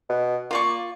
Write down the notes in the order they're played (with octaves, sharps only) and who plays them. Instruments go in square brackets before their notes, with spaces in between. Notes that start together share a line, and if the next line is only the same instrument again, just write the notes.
[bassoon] B2
[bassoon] A#3 [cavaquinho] F4 D5 C#6